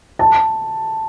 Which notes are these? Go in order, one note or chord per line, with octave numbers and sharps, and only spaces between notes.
A5